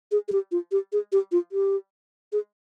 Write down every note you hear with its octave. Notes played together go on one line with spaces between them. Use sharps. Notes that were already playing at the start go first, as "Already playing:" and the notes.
G#4
G#4
G4
F4
G4
G#4
G4
F4
G4
G#4